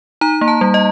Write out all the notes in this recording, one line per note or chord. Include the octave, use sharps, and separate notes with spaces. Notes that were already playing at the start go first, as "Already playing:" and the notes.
D#4 A#5
A#3
A5
G3
D#5